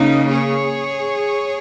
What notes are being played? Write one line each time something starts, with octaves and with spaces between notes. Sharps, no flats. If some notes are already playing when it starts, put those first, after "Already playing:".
Already playing: C#3 A#3 D#4
G#4 C#5